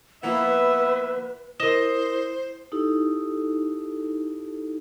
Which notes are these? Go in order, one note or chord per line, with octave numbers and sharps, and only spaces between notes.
F3 A#3 B3 E4 B4 E5
E4 A#4 C5 D#5 E7
D#4 E4 G4 A4